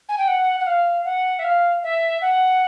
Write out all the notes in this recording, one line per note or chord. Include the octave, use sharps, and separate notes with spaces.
G#5
G5
F#5
F#5
F5
F#5
E5
F5
E5
F#5